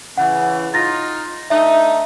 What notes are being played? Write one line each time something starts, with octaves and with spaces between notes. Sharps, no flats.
C#3 E3 F#5
D#4 F4 A6 A#6
A3 D4 D#4 E5